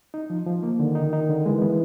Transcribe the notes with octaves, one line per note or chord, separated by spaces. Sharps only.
D#4
F3
F3
A#3
D3 D#3
D#4
D#4
D3
E3 G#3
B3